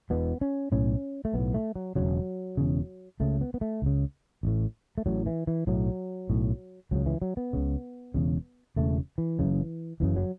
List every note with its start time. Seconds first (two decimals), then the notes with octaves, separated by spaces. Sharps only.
0.10 E1 E2 B2 B3
0.41 C#4
0.72 B1 A2 C#4
1.25 A3
1.34 B1 A2 B3
1.54 A3
1.75 F#3
1.96 E1 E2 C#3 F#3
2.57 E1 E2 C#3
3.20 C#2 C#3 A3
3.41 B3
3.54 B3
3.61 A3
3.82 C#2 C#3
4.43 A1 A2
4.98 A3
5.06 A1 A2 F#3
5.26 E3
5.47 E3
5.67 B1 A2 F#3
6.30 B1 A2
6.91 C#2 C#3 F#3
7.06 E3
7.22 F#3
7.37 B3
7.53 C#2 C#3
8.14 E1 E2 C#3
8.76 E1 E2 C#3 A3
9.18 E3
9.39 F#1 F#2 C#3
10.00 F#1 F#2 C#3 E3
10.16 F#3